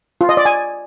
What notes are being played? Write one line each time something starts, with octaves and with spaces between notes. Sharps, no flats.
F4
D#5
D5
G#5